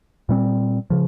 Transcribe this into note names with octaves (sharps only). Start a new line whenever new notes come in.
A#2 G3 C4
C#3 F3